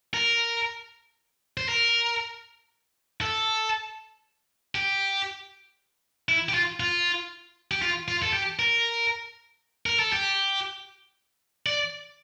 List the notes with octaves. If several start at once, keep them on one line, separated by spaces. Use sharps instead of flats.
A#4
C5
A#4
A4
G4
E4
G4
F4
F4
G4
F4
F4
A4
G4
A#4
A#4
A4
G4
D5